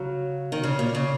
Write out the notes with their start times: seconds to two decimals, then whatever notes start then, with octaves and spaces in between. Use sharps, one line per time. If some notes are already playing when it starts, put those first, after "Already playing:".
Already playing: C#3 F#3
0.52 D#3
0.63 C#3
0.79 A#2
0.95 C#3